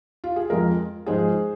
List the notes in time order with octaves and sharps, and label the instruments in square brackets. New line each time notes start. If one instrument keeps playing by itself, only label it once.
[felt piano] F4
G#4
F2 F3 G#3 F4 A#4
G#2 F3 G#3 G#4 C5